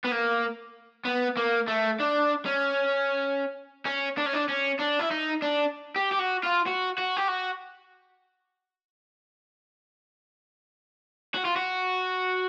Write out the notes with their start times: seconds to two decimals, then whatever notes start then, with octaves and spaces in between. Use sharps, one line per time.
0.05 B3
0.12 A#3
1.05 B3
1.37 A#3
1.68 A3
2.00 D4
2.46 C#4
3.85 C#4
4.17 D4
4.26 C#4
4.33 D4
4.48 C#4
4.79 D4
4.99 E4
5.11 D#4
5.42 D4
5.96 G4
6.12 G4
6.19 F#4
6.43 F4
6.67 F#4
6.98 F#4
7.17 G4
7.28 F#4
11.34 F#4
11.45 F4
11.56 F#4